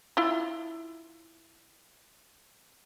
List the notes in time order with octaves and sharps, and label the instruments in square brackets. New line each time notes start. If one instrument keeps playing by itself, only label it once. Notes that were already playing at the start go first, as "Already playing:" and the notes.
[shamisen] E4 F4